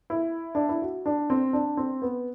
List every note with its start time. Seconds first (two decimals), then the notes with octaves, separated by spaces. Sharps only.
0.10 E4
0.55 D4
0.69 E4
0.82 F#4
1.06 D4
1.30 C4
1.53 D4
1.77 C4
2.02 B3